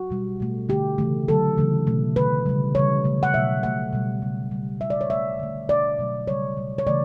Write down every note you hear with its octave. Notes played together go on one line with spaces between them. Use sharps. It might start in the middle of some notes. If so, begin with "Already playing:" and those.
Already playing: F#4
B2 G3
B2 A3
D3 A3 G4
C#3 E3 A3
D3 F#3 A3 A4
C#3 E3 A3
B2 F#3 A3
D3 A3 B4
C#3 G3
C#3 E3 G3 C#5
C#3 F#3 A3
F#5
B2 F#3 A3 E5
B2 A3 F#5
B2 G3
C#3 G3
C#3 G3
B2 G3 E5
D5
C#5
B2 A3 E5
D3 A3
B2 A3 D5
B2 F#3 A3
C#3 G3 C#5
B2 G3
C#5
C#3 E3 A3 D5